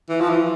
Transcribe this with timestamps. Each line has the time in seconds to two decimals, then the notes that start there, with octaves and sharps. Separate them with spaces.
0.09 E3
0.21 F3
0.30 E3